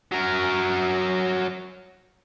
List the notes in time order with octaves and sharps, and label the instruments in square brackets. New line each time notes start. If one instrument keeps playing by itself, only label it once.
[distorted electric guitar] F#3 A#4